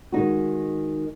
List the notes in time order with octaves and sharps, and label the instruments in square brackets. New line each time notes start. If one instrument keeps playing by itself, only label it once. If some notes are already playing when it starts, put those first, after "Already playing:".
[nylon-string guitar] D#3 G#3 D#4 F#4